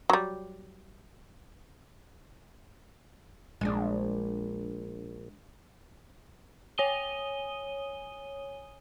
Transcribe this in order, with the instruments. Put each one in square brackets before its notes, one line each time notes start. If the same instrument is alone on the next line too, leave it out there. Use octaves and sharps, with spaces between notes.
[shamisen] F#3 G3
[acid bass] A#1 [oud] G#3 D4
[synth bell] C#5 G#5 D#6 D#7 G7